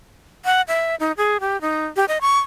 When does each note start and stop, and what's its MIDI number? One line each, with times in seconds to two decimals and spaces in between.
0.45 0.61 78
0.68 0.95 76
1.00 1.12 63
1.17 1.37 68
1.41 1.60 67
1.61 1.87 63
1.96 2.05 67
2.08 2.18 75
2.21 2.39 85